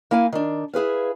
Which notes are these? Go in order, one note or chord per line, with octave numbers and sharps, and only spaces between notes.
A#3 E4 F5 G#5
D#3 D4
E4 G#4 B4 F5